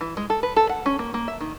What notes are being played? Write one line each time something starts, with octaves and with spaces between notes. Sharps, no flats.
E3
G#3
A4
B4
A4
F#5
C#4
A#3
A#3
E5
D#3